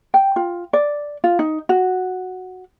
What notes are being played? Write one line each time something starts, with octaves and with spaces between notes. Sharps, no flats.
G5
F4
D5
F4
D#4
F#4